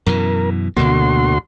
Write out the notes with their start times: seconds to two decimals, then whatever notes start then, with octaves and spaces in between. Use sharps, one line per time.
0.06 F#2 B2 E3 A#4
0.77 D2 B2 D3 A#3 F#4 C6